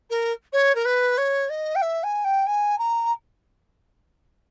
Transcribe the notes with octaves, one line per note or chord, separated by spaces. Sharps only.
A#4
C#5
A#4
B4
C#5
D#5
G5
E5
G#5
G5
G#5
A#5